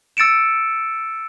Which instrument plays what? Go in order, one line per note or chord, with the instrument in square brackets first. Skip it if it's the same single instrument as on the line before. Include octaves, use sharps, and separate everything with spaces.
[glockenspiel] E6 A6 C#7 D7 E7